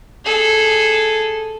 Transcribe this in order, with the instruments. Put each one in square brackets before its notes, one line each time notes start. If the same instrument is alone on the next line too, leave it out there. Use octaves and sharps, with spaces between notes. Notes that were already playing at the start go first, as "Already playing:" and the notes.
[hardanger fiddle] G#4 A4